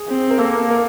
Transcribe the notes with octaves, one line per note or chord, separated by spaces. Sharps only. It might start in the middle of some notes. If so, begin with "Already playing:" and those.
Already playing: G#4
C4
A#4
A#3 A4
A#4
A#4